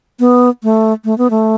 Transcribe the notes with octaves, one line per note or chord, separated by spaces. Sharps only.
B3
A3
A3
B3
A3